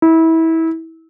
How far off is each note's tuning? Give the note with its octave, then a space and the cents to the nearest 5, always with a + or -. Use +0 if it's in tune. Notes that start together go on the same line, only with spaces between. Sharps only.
E4 -25